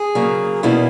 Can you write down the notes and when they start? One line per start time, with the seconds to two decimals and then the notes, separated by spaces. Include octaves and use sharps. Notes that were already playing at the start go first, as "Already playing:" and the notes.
Already playing: G#4
0.15 C#3 F#3 A#3
0.63 E2 B2 A#3 C#4 E4